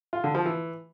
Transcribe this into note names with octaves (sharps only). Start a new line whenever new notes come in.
F4
D3
F3
E3